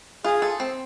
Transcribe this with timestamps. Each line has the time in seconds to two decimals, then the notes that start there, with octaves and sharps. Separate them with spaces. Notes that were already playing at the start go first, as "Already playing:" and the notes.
0.24 F4 G#4
0.42 A4
0.60 C4